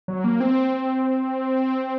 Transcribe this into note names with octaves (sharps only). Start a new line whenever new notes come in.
F#3
A#3
C4